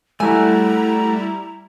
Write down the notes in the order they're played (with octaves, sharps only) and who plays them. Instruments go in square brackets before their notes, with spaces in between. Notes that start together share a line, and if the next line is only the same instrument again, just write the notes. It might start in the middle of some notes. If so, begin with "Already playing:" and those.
[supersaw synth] G3 E4 [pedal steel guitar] A3 F#4 [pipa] G#5 [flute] A#5